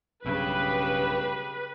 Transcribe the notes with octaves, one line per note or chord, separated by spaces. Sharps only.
B1 G2 C#3 G4 B4